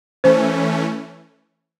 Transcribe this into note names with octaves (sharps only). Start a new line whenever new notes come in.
E3 A3 C#4 C5